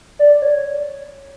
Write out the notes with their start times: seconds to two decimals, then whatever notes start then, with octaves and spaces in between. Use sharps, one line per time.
0.19 D5
0.42 C#5